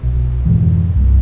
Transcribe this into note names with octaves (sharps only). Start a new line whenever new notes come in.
B1
F2 G#2 B2 E3
C2 G2